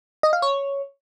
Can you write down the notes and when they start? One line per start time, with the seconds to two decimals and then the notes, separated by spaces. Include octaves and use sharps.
0.23 D#5
0.33 F5
0.42 C#5